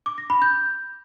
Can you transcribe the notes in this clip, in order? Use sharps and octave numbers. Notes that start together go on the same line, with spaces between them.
D6
A#6
B5
G6